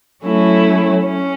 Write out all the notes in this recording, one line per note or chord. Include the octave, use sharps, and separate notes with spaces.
F#3 A3 C#4 E4
C#4